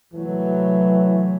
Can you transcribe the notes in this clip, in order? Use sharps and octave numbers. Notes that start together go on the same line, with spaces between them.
C3 E3 F#3 A3